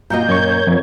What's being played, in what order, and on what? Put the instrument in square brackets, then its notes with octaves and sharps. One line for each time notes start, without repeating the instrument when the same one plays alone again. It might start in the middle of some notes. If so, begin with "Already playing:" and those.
[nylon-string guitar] A#2 A#3 D#5 [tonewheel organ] F4 F#4 A#5 [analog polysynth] G6
[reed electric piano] F#2 C#6 [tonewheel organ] A#4 C#5 G#6
[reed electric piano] F2